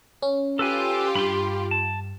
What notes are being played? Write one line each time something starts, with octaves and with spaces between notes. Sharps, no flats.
C#4
F4 G4 A4 B4 G#5
G2 B5 C6
A5